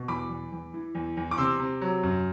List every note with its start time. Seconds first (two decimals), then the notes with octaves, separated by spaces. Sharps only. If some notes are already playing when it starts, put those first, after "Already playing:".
Already playing: B2
0.08 E2 B5 D6
0.29 E2
0.52 E2
0.74 E3
0.95 E2
1.17 E2
1.31 D6
1.38 C3 C6 E6
1.60 C3
1.81 F#3
2.03 F#2